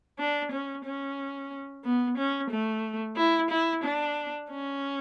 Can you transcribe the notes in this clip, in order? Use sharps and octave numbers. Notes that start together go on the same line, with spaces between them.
D4
C#4
C#4
B3
C#4
A3
E4
E4
D4
C#4